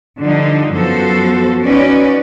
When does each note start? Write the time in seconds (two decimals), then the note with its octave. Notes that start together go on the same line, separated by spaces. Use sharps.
0.20 D3 F3 G3 D#4
0.74 F#2 F3 B3 F#4 A4 C5
1.65 C#4 D#4 F#4 B4 D5